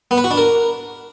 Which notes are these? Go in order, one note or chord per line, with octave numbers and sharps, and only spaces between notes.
B3
B4
F#4
D4
A#4